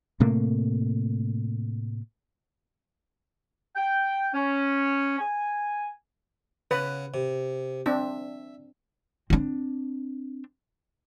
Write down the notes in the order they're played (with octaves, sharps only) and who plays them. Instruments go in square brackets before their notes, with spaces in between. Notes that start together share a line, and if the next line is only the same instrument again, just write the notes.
[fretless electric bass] A2 C3 A3 A#3
[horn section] G5
C#4
G#5
[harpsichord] C#3 F#5 [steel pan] B4
[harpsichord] C3
[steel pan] C4 D4 [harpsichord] E5
[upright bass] C4 D4